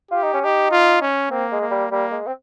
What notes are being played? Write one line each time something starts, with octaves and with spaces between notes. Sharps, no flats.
F4 G4
D#4
C#4
D#4 G4
F4
C#4
A#3 C4
G#3
A#3
G3
G3 A#3
G#3
C4